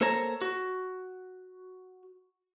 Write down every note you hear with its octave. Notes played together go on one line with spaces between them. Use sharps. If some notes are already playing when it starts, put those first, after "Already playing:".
A#3 A4 C5 C#5 A5 A#5
F#4